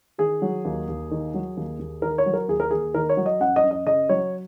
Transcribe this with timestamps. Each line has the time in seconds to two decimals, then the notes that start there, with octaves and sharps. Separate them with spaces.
0.18 D#3 G#4
0.42 F#3
0.65 D#2
0.88 D#2
1.11 D#3
1.34 F#3
1.57 D#2
1.79 D#2
2.02 D#3 A#4
2.18 C#5
2.26 F#3
2.34 A#4
2.48 D#2 G#4
2.60 A#4
2.71 D#2 G#4
2.94 D#3 A#4
3.09 C#5
3.17 F#3
3.26 D#5
3.40 F#2 F#5
3.56 D#5
3.64 F#2
3.71 D#5
3.86 C#3 D#5
4.09 F#3 C#5